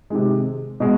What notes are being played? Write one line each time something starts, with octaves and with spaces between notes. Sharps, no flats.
C3 D#3 G#3
B2 G#3